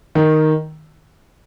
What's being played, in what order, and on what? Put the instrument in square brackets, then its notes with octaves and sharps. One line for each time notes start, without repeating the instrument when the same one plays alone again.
[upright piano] D#3